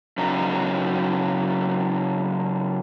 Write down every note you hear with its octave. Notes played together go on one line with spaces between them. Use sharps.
C#3 F#3 D#4